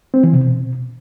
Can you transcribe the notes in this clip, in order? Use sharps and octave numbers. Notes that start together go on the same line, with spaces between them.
C4
E3
C3
B2